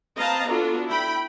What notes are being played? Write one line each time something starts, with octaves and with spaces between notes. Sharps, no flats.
C4 B4 D#5 F5 A5 A#5
B3 D4 F4 F#4 A4
E4 G5 B5